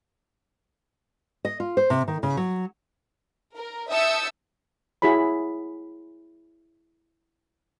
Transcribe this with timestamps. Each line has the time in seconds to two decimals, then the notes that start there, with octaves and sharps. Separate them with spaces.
1.45 D#5
1.60 F4
1.77 C5
1.90 C3
2.08 D#3
2.23 C#3
2.37 F#3
3.55 A#4
3.90 E5 A5 D#6 E6 G6 C#7
5.02 E4 F#4 G#4 C#5 B5